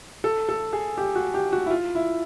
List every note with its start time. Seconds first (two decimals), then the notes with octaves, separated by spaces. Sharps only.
0.24 A4
0.49 A4
0.73 G#4
0.98 G4
1.15 F#4
1.34 G4
1.53 F#4
1.66 E4
1.71 F4
1.95 E4